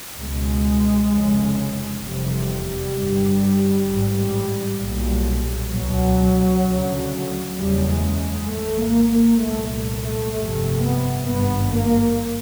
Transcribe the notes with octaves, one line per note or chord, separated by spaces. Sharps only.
C#2 B2 G#3
F1 F2 C#3
F1 E2 C3 G3
G1 G2
A1 G#2
B1 A#2
C#2 B2 F#3
D2 C#3
F#1 E2 C#3 G3
G#3
G#3
G#1 G#2 A3
A#3
A#3
C2 A#2 A3
A3
G1 F2 C3 A3
B3
G#1 G2 B3
A#3